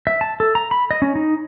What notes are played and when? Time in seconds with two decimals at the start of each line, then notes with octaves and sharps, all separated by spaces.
0.07 E5
0.21 A5
0.40 A4
0.55 A#5
0.71 B5
0.91 D#5
1.02 C#4
1.16 D#4